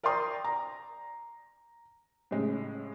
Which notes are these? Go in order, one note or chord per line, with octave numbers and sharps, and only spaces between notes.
A#4 D5 G5 A#5 C6 D#6
A#5
A2 C#3 G#3